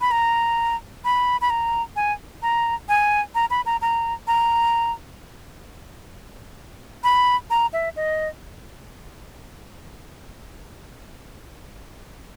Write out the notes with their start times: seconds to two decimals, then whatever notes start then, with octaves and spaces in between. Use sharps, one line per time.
0.01 B5
0.11 A#5
1.05 B5
1.41 B5
1.50 A#5
1.96 G#5
2.43 A#5
2.89 G#5
3.35 A#5
3.50 B5
3.66 A#5
3.82 A#5
4.27 A#5
7.04 B5
7.50 A#5
7.73 E5
7.96 D#5